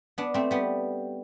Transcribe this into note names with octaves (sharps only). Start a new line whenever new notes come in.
B3 D4
A3 C4
G3 B3